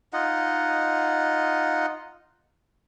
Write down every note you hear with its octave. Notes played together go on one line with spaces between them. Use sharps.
D#4 F4 D#5 F#5